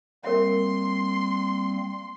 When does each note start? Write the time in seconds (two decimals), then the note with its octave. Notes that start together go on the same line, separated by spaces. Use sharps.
0.24 G3 A#3 C4 A#4 C#5 E5 C6